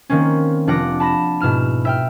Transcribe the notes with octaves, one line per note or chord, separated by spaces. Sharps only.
D#3 A#3 C4 C#4
F1 D4 F4 F#5 D6 A#6
A5 B5 A#6 E7
G#2 B2 E4 F6 E7
E5 G5 F6